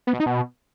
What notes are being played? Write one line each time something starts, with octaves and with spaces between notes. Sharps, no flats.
B3
B2
D#4
B2